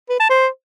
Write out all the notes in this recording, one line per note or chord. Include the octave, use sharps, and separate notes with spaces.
B4
A5
C5